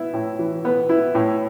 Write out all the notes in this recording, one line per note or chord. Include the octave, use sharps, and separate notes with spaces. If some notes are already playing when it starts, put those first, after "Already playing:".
Already playing: B3 E4
A2
E3
B3
E4
A2